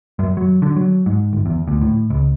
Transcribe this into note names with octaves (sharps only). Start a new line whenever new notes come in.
F#2
F#3
D3
F#3
G#2
G1
E2
D2
A2
C#2